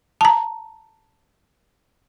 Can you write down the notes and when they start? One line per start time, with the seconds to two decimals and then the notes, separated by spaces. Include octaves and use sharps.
0.21 A5 A#5